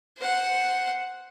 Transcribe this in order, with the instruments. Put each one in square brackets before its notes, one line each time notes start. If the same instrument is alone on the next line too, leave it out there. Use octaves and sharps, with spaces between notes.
[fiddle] C5 F#5